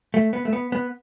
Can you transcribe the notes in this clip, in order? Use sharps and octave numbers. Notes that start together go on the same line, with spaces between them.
A3
B3
A3
B3
B3